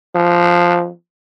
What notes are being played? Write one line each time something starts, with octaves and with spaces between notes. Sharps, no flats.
F3